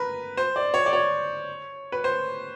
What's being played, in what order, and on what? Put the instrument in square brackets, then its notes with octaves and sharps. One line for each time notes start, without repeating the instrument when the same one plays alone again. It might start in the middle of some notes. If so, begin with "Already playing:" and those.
Already playing: [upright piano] A#4 B4
C5
D5
C#5
D5
C#5
B4
C5